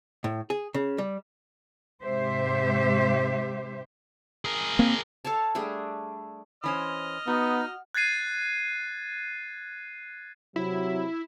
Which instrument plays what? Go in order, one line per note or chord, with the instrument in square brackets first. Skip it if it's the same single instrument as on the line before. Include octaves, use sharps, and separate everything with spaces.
[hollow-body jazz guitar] A2
G#4
C#3
G3
[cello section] G#2 C3 G4 C5 E5
[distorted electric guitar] G#4 A#4
[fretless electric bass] A#3 C4
[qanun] A4 C#5 F5 A5
G3 A3 D4 G#4
[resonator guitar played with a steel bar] E3 C#4 C5 [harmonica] D#5 F6
[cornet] B3 [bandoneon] D#4 [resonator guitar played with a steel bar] F#4
[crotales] F#6 G#6 A6 C7 D#7
[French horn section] C3 F#3 [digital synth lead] E4